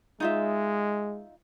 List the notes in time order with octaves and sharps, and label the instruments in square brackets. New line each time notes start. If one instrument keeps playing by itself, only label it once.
[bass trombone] G#3 [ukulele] D#4 F4 E5